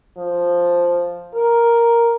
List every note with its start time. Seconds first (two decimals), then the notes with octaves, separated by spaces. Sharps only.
0.18 F3
1.34 A#4